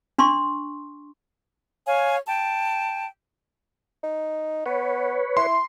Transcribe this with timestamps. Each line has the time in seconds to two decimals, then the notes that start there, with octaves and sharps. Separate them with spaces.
0.18 D4 C6 C#6
1.86 C#5 F5 G#5
2.26 G5 A5
4.03 D#4
4.66 B3 B4 C#5
5.37 E4 C6